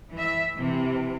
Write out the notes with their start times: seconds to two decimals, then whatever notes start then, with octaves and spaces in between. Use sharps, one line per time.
0.14 E3 E5
0.55 C3 E3